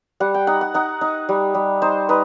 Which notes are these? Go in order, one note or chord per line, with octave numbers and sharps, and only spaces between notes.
G3 F#5
G5
D#4 F#5
F#5
D#4 F#5
D#4
G3
G3
D#4 C5
D#4 B4